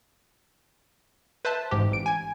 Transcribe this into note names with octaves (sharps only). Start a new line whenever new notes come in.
B4 C5 E5 A5
A1 G#2 G4
A1 D7
G#5 G#6